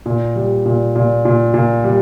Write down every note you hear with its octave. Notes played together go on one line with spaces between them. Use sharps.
A#2
G3
A#2
A#2
A#2
A#2
G3